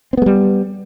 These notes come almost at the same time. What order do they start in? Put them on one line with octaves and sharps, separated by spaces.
C4 B3 G#3 G3